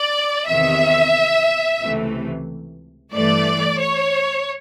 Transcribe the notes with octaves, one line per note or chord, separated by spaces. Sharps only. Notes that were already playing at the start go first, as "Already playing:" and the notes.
Already playing: D5
E2 C3 D#3 E5
C#2 C3 E3 A3
G2 E3 A3 D5
C#5